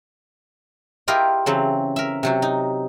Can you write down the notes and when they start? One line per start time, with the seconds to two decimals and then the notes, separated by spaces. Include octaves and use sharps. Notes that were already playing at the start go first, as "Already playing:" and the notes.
1.08 E4 F4 G4 A#4 D#5
1.46 C#3 E3 F#3 C4
1.96 A#4 E5
2.23 C3 F#3 F#4
2.42 D#4